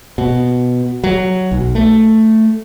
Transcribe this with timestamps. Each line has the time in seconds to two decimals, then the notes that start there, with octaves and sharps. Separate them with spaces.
0.18 B2
1.04 F#3
1.51 B1
1.75 A3